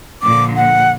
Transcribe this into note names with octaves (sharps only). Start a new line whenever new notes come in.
A#2 D3 F3 D6
F#5